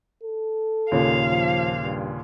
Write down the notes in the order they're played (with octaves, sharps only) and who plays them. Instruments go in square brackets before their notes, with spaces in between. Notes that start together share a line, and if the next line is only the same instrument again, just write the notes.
[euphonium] A4
[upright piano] D#2 A#2 C#3 [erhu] F5
[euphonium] F3
G2